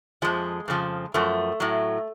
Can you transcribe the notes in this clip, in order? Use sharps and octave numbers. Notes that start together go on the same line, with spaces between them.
F2 F3 G#3
F2 C#3 F3
F#2 F3 A3
A2 F#3